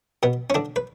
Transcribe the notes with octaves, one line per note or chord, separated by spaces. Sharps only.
B2 B3
C#4
D3 D4
B4